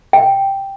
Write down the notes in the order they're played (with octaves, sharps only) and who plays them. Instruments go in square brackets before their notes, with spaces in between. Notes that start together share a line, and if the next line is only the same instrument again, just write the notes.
[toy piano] G5